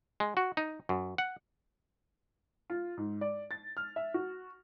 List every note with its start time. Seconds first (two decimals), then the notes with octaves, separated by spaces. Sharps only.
0.20 G#3
0.37 F#4
0.57 D#4
0.89 F#2
1.18 F#5
2.70 F4
2.97 G#2
3.21 D5
3.51 A6
3.77 F6
3.96 E5
4.14 F#4